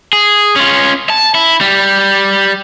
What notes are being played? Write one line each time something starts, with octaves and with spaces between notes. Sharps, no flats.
G#4
C#4 F4
A5
E4
G3